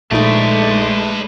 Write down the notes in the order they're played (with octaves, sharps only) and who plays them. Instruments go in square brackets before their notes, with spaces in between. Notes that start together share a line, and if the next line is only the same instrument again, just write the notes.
[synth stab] A#1 D#4 [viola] D3 G#3 [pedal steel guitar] A3 [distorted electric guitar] B4 D5